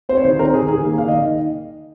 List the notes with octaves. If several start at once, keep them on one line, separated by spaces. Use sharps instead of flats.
C4 C5
C#5
D#3 C5
C4 A#4
D#3 G#4
D#3 G#4
A#3
D#3 F5
D#5
D#3